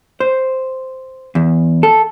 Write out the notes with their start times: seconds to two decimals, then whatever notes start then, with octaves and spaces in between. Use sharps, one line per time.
0.20 C5
1.35 E2
1.83 A4